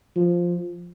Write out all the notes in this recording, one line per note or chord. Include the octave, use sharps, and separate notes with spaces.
F3